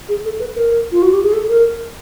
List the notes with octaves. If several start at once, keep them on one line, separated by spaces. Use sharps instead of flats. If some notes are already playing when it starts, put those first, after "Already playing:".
G#4
A4
B4
A#4
F4
F#4
G4
G#4
A4
A#4